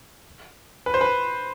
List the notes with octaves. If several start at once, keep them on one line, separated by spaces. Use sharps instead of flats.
B4
C5
B4